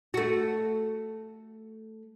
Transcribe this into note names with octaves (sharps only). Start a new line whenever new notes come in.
A3 F#4